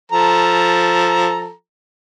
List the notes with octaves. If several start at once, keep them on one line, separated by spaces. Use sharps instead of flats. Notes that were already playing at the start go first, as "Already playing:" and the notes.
F3 A4 A#5